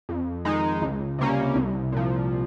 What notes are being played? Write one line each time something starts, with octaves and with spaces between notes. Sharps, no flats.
F2
D#3 G#3 D#4
C#2
C3 G3 A#3 C#4
C2
A#2 F3